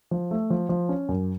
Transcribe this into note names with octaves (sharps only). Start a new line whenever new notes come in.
F3
A3
F3
F3
C#4
F#2